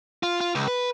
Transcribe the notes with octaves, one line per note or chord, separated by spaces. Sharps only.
F4
F4
C#2
B4